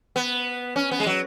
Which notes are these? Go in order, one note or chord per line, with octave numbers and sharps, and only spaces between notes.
B3
C#4
B3
G#3
F#3